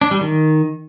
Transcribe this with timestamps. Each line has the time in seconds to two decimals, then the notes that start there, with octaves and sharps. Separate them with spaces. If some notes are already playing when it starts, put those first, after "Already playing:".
0.02 D4
0.11 G3
0.21 D#3